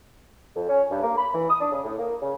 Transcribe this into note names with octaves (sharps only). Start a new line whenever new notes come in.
F2
C#4
G2
A#3
B5
E3
D#6
D4
C#3
A2
A#3
C#3